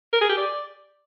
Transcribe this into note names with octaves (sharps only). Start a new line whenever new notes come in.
A#4
G#4
G4
D5